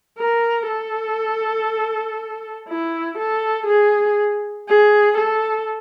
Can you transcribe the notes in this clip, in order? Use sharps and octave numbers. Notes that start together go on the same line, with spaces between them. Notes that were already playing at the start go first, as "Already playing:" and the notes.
A#4
A4
E4
A4
G#4
G#4
A4